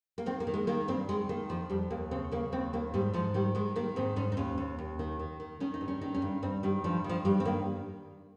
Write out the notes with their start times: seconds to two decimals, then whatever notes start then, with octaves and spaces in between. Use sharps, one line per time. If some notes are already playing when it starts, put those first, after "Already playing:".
0.18 A#3
0.26 D#3 C4
0.40 A#3
0.47 D#3
0.54 G#3
0.67 D#3 A#3
0.88 G2 C4
1.09 D#3 G#3
1.29 D#3 A#3
1.49 F2 F3
1.69 F2 G3
1.90 D#2 A#3
2.11 C#3 C4
2.31 C#3 A#3
2.52 D#2 C4
2.73 D#3 A#3
2.94 G#2 G3
3.13 G#2 F3
3.34 D#3 G3
3.55 D#3 G#3
3.76 D#3 A#3
3.96 G#2 C4
4.16 G#2 C#4
4.32 D#4
4.37 D#2 C#4
4.58 D#2
4.79 D#2
4.99 D#3
5.19 D#3
5.40 D#3
5.60 D#3 C#4
5.74 D#4
5.81 G2
5.88 C#4
6.01 D#3 D#4
6.14 C#4
6.22 G2
6.42 G2 C4
6.63 D#3 G3
6.84 G2 F3
7.04 D#3
7.09 F3
7.25 G2 G3
7.40 C4
7.45 D#3 A#3